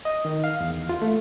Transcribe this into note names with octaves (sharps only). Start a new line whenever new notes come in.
D#5
D#3
F5
E2
F4
A3